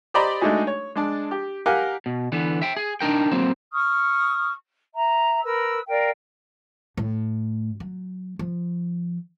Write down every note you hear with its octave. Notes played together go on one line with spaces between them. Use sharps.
G4 C5 D5 D#5 A#5 B5
G#3 A3 D4 D#4 F#4 G#4
C#5
G#3 D4 A5
G4
G4 A#4 F5 F#5 G#5
B2
D3 E3 B3
E5 G5
G#4
D4 D#4 A#4 G5
F#3 A#3 C4
C#6 D#6 F6
E5 A#5
A#4 B4 E6
A#4 D5 F5 G5
A2
F#3
F3